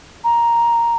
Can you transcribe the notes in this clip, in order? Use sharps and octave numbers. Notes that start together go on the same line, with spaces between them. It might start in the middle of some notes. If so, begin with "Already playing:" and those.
A#5